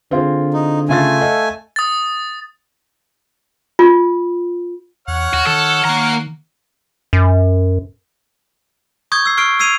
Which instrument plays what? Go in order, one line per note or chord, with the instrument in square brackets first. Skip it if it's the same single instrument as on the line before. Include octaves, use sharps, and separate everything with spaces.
[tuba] D3 [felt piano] C4 F4 G#4
[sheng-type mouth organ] D#4
[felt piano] C#3 F4 A6 [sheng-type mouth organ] A3 G#5
[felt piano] A4 D#5 F5
[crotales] D#6 A6
[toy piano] F4
[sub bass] E2 [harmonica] C#5 F#5 F6
[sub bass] D#2 [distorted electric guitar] F#4
[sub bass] D#3 [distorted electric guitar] A4
[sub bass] D#3 [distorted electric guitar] A#3 A#5
[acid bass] F#2
[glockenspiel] C#6 D#6 G6 G#6
E6 C7
C#6 F6 C7 D7
E6 G#6 C7 D#7 F7